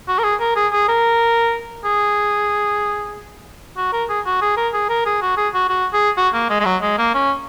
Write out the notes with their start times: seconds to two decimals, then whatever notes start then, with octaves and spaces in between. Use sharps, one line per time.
0.08 F#4
0.19 A#4
0.24 G#4
0.40 A#4
0.56 G#4
0.73 G#4
0.89 A#4
1.85 G#4
3.77 F#4
3.93 A#4
4.09 G#4
4.26 F#4
4.42 G#4
4.57 A#4
4.74 G#4
4.90 A#4
5.06 G#4
5.22 F#4
5.37 G#4
5.54 F#4
5.69 F#4
5.93 G#4
6.18 F#4
6.34 A#3
6.50 G#3
6.60 G#3
6.65 F#3
6.82 G#3
6.98 A#3
7.14 C#4